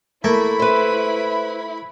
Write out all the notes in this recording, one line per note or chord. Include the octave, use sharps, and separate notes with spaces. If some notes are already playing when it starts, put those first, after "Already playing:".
A3 A#3 E4 B5
B4 C5